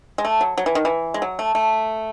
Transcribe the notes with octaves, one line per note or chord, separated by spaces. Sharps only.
G#3
A3
F#3
F#3
E3
D#3
E3
G#3
F#3
A3
A3